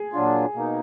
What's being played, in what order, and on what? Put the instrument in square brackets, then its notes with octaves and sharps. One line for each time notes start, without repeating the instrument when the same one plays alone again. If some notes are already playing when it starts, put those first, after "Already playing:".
Already playing: [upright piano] G#4
[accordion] A#2 F#3 D4 F4
B2 A#3 D#4